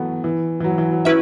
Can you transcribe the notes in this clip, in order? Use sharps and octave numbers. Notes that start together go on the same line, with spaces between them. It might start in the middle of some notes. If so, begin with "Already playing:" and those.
Already playing: E3 F#3 A3 B3
E3
E3
F#3
E3
F#3
C#4 E4 F#4 B4 E5